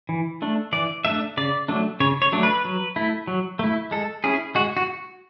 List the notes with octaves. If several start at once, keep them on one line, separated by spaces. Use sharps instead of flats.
E3
A3 D4
E3 D5
A3 D4 E5
C#3 D5
F#3 A3 D4
C#3 C#5
C#5
F#3 A3 D4
B4
F#3
A3 E4
F#3
A3 E4
G#3 A4
C#4 E4 G#4
G#3 F#4
F#4